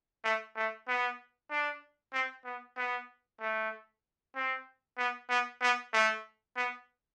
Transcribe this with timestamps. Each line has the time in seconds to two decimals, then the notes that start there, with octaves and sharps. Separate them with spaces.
0.24 A3
0.56 A3
0.88 B3
1.51 D4
2.13 C4
2.45 B3
2.77 B3
3.41 A3
4.35 C4
4.98 B3
5.30 B3
5.62 B3
5.93 A3
6.57 B3